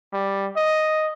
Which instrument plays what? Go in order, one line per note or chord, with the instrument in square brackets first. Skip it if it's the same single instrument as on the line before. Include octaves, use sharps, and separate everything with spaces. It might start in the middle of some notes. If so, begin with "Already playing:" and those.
[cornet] G3
D#5